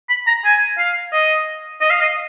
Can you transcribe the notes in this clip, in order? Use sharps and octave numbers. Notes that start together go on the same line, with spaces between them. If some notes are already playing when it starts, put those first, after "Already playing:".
B5
A#5
G#5
F5
D#5
D#5
F5
D#5